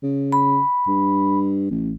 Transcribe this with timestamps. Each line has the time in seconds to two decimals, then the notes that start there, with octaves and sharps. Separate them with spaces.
0.03 C#3
0.32 B5
0.88 G2
1.70 A1